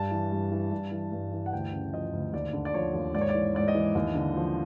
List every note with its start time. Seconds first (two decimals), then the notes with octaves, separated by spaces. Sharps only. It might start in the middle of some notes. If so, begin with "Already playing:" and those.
Already playing: G2 A5
0.11 E3
0.32 G2
0.52 E3
0.71 G2
0.91 E3
1.12 G2
1.32 E3
1.46 F#5
1.53 D2 G5
1.73 C#3
1.93 F3 D#5
2.13 D2
2.33 D#2 D5
2.53 D3
2.65 D5
2.74 F3 C#5
2.94 D#2
3.14 G#2 D5
3.21 C#5
3.29 D5
3.34 E3
3.55 G#2 D5
3.68 D#5
3.75 E3
3.95 D#2
4.15 D3
4.36 F3